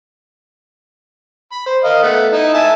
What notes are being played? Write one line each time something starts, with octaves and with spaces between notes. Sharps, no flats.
B5
C5
A#4 D#5 F5
A3 B3 F#5
D#4 E4
E5 G#5 A5